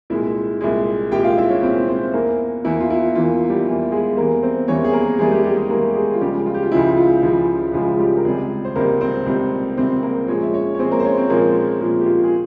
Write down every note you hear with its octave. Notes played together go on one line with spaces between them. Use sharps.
C2 A#2 G#3 E4 E5
C2 A#2 G#3
C2 A#2 G#3 G4 G5
F4 F5
E4 E5
C#4 C#5
C2 A#2 G#3 C4 C5
C4 C5
E2 E3 A#3 A#4
E2 E3 A#3 E4
F4
E4
E2 E3 A#3 F4
G3 G4
E2 E3 A#3
G#3 G#4
E2 E3 G3 A#3 A#4
C4 C5
E2 E3 G3 A#3 C#4 C#5
G#4
A#3 A#4
E2 E3 G3 G#3 A#3 G#4
G3 G4
G3 G4
G#3 G#4
E2 E3 G3 A#3 A#4
G4
G#3 G#4
F4
C#2 C#3 F3 G3 G#3 G4
F4
G4
F4
C#2 C#3 F3 G#3 E4
F4
C#2 C#3 F3 G#3
C#2 C#3 F3 G#3 F4
G3 G4
A#4
C#2 C3 G3 G#3 G#4
C5
C#2 C3 G3 A#3 A#4
C4 C5
C#2 C3 G3
C#2 C3 G3 C4 C5
A#3 A#4
A#2 F3 G#3 C#4 C#5
E5
C#4 C#5
C#5
A#2 F3 G#3 C4 C5
A#3 A#4
C5
C#4 C#5
C4 C5
A#2 F3 G#3 A#3 A#4
A#2 F3 G#3
G4
F4
G#4